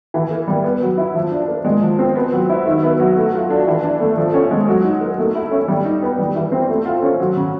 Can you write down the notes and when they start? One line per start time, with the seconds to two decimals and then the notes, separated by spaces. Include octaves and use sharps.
0.14 E3
0.31 A#3
0.48 G3
0.64 B3
0.82 F#3
0.98 E4
1.15 F3
1.31 D4
1.48 A#3
1.65 G#3
1.82 F3
1.99 C4
2.15 B3
2.32 F#3
2.49 E4
2.65 D#3
2.83 B3
2.99 F#3
3.17 A3
3.34 F4
3.50 D4
3.67 E3
3.83 D4
4.00 A3
4.17 F3
4.34 C#4
4.51 G#3
4.68 F#3
4.84 D#4
5.01 A#3
5.18 A3
5.35 E4
5.51 C#4
5.68 G3
5.85 D#4
6.02 B3
6.19 G3
6.36 E3
6.52 C4
6.69 A3
6.86 F4
7.03 C#4
7.20 F#3
7.37 C#3